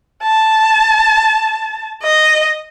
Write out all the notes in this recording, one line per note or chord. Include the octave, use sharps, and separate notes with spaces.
A5
D#5